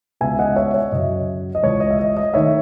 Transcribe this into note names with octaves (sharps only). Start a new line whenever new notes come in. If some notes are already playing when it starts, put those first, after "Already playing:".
C#2 C#3 G#3 B3 E5 G#5
D#5 F#5
C#5 E5
C#5 E5
F#2 C#3 F#3 D#5
D#5
C#2 C#3 E3 C#5
D#5
E5
D#5
D#5
D#3 A3 C#5 E5